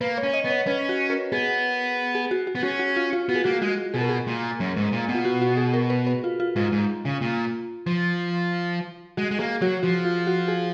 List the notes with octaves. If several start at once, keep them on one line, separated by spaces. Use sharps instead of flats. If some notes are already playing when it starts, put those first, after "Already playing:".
A#3 B4
C#5
C#4
D#5
B3
C#5
C#4 B4
F#4
A#4
B3 G#4
G#4
F#4
F#4
B3
C#4 F#4
F#4
F4
F4
B3 F#4
G#4
A#3 F#4
G#3 F#4
B2 G#4
A#4
G#4
A#2
F#2
G#2
A#2
B2
F4
F#4
F#4
G#4
A#4
B4
B4
F4
F4
G#2 F4
G#2
C#3
A#2
F3
G#3 F#4
G#3
A#3 G#4
F#3 F#4
F3 F#4
F4
F#4
G#4